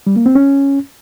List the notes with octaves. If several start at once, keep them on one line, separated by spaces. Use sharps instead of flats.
G3
A#3
C4
C#4